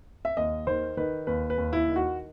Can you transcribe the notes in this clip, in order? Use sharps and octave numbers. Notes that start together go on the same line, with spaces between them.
E5
D#2 D#5
D#3 C5
D#3 B4
D#2 B4
B4
D#2
E4
D#3
F#4